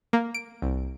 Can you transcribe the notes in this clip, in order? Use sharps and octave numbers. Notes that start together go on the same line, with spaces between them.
A#3
D7
C2